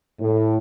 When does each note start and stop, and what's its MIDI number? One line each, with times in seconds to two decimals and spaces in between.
0.20 0.57 45